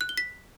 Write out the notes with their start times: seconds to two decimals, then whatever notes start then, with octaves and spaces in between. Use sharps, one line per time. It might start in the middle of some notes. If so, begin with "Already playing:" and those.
0.01 F#6
0.09 G7
0.18 B6